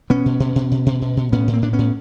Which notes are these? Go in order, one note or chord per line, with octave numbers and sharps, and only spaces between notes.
B2 B3 C#4
B2
B2
B2
B2
B2
B2
B2
A2 B3 C#4
A2
A#3 C4
A2 D4
B3 C#4
A2